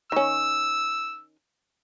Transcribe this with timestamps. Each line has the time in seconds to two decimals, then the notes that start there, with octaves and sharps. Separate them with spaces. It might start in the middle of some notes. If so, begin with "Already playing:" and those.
0.12 D#3 C#4 E6